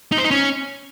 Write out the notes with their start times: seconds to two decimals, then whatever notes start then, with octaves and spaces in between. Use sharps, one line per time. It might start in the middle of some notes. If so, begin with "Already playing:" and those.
0.12 D#4
0.18 C5
0.24 D#4
0.31 C#4